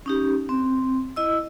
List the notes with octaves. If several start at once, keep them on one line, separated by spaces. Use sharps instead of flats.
C#4 D#4 G4
C4
E4 D#5 E6